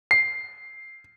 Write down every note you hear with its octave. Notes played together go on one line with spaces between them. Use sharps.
C7